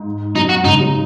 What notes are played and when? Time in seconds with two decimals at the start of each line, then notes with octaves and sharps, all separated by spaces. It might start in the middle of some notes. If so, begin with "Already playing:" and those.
Already playing: G#2
0.36 F#2 B2 D#4
0.49 F#4
0.65 G#2 C#3 D#4
0.80 C#3 F#3